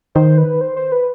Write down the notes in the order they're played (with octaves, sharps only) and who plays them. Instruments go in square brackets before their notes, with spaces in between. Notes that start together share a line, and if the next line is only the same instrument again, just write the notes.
[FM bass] D#3 [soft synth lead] C5
[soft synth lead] B4
C5
C5
B4